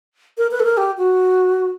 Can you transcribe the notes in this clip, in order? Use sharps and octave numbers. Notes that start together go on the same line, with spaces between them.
A#4
B4
A4
A#4
G4
F#4